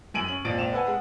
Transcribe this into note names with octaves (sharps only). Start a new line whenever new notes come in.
F#2 G#5 D7 D#7 F#7
C#4 F#7
F2 A#2 C4 A6 D7
C#2 A#2 C4 E7 F7
A4 B4 F#5 G#5
G#3 F#5